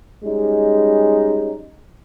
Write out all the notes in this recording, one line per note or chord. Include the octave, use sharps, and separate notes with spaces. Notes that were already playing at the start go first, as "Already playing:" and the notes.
G3 G#3 C#4 D#4